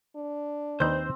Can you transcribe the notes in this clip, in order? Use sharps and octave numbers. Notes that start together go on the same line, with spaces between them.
D4
D#2 C4 D#4 B4 C5 G6